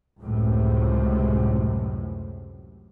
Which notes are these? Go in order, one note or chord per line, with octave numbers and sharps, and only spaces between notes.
C#2 F#2 A2 C3